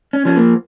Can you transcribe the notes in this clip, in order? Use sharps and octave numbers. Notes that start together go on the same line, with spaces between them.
C#4
F3 C#4
A#3